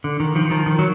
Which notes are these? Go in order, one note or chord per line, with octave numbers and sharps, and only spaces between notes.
D3
D#3
D#3 F3
D#3 F3
D#3
F#3